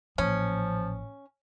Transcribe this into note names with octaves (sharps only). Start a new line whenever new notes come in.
A1 A#2 F3 C#4